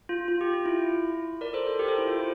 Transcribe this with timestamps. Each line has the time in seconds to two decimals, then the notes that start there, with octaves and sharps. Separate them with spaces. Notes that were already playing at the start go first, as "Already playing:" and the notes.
0.09 F4
0.28 F4
0.41 G4
0.53 F4
0.66 E4
1.41 A#4 D5
1.53 A4 C5
1.67 A4 C5
1.79 G4 A#4
1.88 A4 C5
1.98 E4
2.08 F4